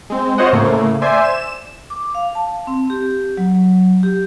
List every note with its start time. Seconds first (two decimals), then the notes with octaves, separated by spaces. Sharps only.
0.10 G#3 C4
0.38 F4 C5 C#5 D#5 F#5
0.53 A2 C#3 A3 A#3
1.02 C5 D5 E5 G#5
1.24 E7
1.90 D6
2.15 F5
2.35 A5
2.67 C4
2.90 G4
3.37 F#3
4.03 G4